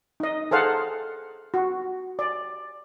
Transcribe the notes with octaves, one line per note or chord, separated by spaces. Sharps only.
D#4 D#5
G#4 A4 C5 F5 F#5
F#4
D5